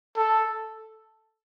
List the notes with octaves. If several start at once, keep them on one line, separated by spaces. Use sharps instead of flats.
A4